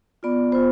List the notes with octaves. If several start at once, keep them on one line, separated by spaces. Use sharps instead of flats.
B3 F4 D5
B3 F4 C5